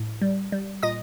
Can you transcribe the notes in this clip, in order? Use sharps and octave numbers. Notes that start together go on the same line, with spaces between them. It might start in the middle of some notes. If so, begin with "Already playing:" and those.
Already playing: A2
G3
G3
A#2 D#5 D#6